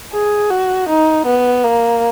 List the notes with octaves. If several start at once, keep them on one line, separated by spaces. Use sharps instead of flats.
G#4
F#4
D#4
B3
A#3